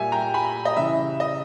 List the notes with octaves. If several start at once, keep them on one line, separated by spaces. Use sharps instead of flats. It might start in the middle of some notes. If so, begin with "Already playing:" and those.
Already playing: A#2 G3 E5 G#5
G5 A#5
G#5 B5
D#5
C#3 E3 G3 E5
D#5